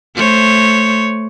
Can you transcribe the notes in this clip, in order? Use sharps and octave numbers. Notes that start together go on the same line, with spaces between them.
A3 C5 C#5